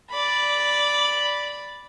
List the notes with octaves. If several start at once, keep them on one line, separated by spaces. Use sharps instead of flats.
D5 B5